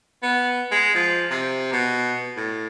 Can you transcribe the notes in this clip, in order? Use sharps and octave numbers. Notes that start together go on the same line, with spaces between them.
B3
G#3
F3
C3
B2
A2